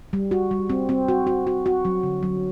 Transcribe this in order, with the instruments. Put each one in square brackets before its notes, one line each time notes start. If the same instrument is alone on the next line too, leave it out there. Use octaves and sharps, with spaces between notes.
[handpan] G3
F#4
G3
C4
C4
F#4
F#4
F#4
F#4
F#3
D3
F#3